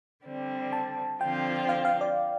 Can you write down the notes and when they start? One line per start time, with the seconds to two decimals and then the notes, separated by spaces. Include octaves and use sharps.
0.25 D3 G3 C4
0.73 A5
1.21 D3 F3 C4 F4 G5
1.69 F5
1.85 F5
2.01 D5